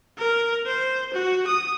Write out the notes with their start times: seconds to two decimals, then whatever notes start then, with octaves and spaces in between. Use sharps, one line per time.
0.18 A#4
0.66 C5
1.14 F#4
1.47 D#6